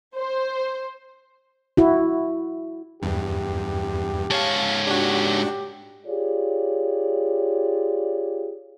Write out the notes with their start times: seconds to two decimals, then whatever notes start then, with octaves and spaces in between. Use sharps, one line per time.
0.17 C5
1.77 E4 F#4
3.02 E2 G2 G4
4.30 G#2 C#5 F5 A5
4.87 D4 F#4 G4
6.06 F4 G4 G#4 C#5 D5